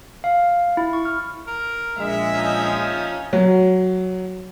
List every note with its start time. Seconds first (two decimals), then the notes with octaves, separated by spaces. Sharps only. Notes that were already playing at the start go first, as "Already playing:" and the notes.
0.24 F5
0.77 E4
0.93 C#6
1.05 F6
1.47 A#4
1.98 A#1 G#3 E5
2.34 F3 C#4 D#4
3.33 F#3